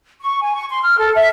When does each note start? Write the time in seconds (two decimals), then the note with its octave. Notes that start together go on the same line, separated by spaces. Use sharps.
0.21 C#6
0.42 G#5
0.54 C#6
0.69 C6
0.83 F6
0.99 A4
1.14 E5